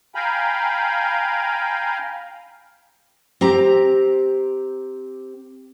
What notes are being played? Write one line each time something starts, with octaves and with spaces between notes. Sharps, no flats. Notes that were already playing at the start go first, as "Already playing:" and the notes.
F5 G5 G#5 A#5 B5
C4 G4 A#5